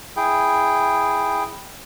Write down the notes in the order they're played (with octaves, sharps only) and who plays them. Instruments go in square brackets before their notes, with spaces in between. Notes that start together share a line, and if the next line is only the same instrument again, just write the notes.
[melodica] E4 G#4 G5